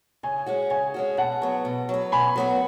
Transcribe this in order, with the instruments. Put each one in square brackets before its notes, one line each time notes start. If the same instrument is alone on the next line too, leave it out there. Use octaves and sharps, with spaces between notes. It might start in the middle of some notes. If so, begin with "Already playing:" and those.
[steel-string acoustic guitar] C#3 [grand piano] G#5
[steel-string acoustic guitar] G#3 C#4 F#4
[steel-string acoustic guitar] C#3 [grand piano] G#5
[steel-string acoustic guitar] G#3 C#4 F#4
[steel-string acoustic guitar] B2 [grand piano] F#5 A5
[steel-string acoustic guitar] F#3 B3
B2
F#3 B3
[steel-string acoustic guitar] B2 [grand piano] G#5 B5
[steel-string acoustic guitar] F#3 B3 F#4